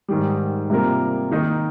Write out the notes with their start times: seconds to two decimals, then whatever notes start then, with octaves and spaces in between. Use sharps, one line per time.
0.08 G#2 D#3 G3
0.70 C3 G3 A#3 F4 A#4
1.31 D#3 A#3 D#4 A#4